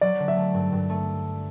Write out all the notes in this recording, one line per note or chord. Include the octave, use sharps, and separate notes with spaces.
F#3 D5
D3
E5
A3
G2
G2
A3